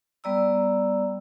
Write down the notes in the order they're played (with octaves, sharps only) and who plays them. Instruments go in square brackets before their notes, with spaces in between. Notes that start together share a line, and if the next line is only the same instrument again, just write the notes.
[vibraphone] G3 B3 D5 A#5 E6